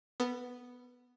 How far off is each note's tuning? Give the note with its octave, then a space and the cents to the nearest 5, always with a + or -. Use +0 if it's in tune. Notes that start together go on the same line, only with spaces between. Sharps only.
B3 +0 A4 +40